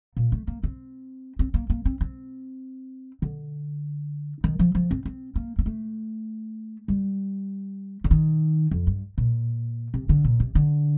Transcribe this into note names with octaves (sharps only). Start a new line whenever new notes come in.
A#2
A3
A#3
C4
C4
A#3
A#3
C4
C4
D3
D#3
F3
F3
C4
C4
A#3
A#3
A3
G3
D3
D#3
F2
G2
A#2
C3
D3
A#2
C3
D3